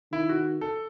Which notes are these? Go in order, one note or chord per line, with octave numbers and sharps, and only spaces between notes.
D#3 E4
F#4
A4